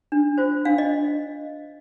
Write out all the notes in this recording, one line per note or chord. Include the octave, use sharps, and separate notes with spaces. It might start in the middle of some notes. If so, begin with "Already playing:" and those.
D4
F4 C5
D4 F5
D#5